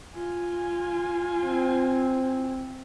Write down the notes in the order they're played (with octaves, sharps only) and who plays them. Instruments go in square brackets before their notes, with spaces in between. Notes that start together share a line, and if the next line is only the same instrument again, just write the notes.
[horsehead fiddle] F4 G#5
[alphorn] C4